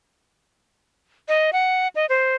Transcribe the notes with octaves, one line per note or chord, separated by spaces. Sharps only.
D#5
F#5
D#5
C5